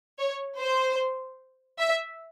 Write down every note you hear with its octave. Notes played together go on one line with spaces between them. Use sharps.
C#5
C5
E5